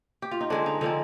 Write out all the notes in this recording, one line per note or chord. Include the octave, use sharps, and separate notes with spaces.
G4
F4
D#4
D3 G#3 C4 D4
D#4
D3 F3 G#3 C4 D#4